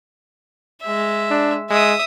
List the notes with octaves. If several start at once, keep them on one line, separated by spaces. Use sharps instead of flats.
G#3 E5
D4
G#3 E5 D#6